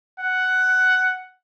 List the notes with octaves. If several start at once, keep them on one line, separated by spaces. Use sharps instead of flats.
F#5